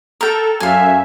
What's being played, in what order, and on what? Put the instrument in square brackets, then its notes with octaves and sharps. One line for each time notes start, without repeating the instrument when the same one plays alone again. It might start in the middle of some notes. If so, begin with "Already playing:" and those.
[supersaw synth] A4 [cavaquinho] A#4 G5
[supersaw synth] F#2 E5 [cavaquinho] F5 G#5